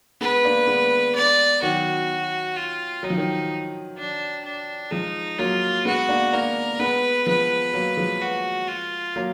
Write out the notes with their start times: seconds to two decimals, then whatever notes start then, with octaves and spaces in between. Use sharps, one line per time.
0.21 G#3 B3 B4
0.44 A#3 D4
0.67 G#3 B3
1.15 D5
1.62 D#3 F#3 F#4
2.56 F4
3.03 F#3 D#4
3.10 F3
3.17 D#3 F#3
3.98 D4
4.44 D4
4.91 F3 G#3 D#4
5.38 F#3 A#3 F4
5.85 G#3 B3 F#4
6.09 A#3 D4
6.33 A#3 D4 A#4
6.80 G#3 B3 B4
7.27 F3 G#3 B4
7.74 F#3 A#3
7.97 F3 G#3
8.22 F#4
8.68 F4
9.16 F#3 A#3